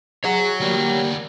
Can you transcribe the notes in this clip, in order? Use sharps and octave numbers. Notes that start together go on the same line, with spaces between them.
G#4 C#5 F#5
D2 G3 A#3